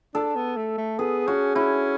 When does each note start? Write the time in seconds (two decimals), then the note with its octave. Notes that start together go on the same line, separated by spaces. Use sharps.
0.14 D4 A4
0.36 B3
0.57 A3
0.78 A3
0.99 B3 G#4
1.27 C#4 F#4
1.55 C#4 E4